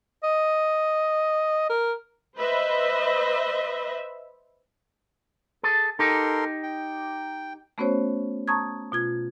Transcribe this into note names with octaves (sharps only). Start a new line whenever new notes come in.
D#5
A#4
B4 C5 D#5 E5
G#4 A4
D#4 G4 A4 A#4 C6
G5
A3 B3 C#4 F#4 C5 C#5
A5 A#5 C#6 D#6 G#6
B2 F4 G#6